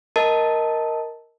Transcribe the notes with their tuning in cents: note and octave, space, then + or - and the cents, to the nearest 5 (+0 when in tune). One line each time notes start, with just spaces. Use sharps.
A#4 +0 D#5 +15 A5 +0